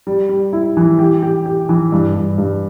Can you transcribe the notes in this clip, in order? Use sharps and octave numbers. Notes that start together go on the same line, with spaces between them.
G3
G3
E4
E3
G4
G4
G4
E3
G2
G2
G2